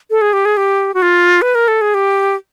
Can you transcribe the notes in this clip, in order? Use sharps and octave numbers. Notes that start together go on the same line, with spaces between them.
A4
G#4
G4
G#4
G4
F#4
F4
B4
A#4
A4
G#4
G4